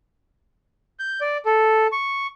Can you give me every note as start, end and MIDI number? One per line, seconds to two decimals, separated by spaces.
0.99 1.20 91
1.21 1.37 74
1.46 1.87 69
1.92 2.27 85